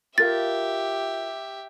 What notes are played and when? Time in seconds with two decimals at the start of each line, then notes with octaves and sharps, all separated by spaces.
0.18 F4 G4 A#4 E5 F5 A6